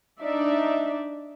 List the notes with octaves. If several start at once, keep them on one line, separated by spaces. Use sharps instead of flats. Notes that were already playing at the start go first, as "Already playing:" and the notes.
D4 D#4 D5 E5